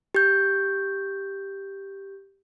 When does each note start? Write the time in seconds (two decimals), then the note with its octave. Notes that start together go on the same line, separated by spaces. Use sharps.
0.15 G4 G6